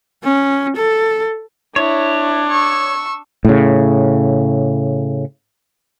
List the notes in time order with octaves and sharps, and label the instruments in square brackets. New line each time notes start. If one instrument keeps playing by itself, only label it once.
[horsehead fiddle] C#4
A4
[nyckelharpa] D4 [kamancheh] E4 [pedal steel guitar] C#5
[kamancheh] C#6 E6
[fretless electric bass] A2 C#3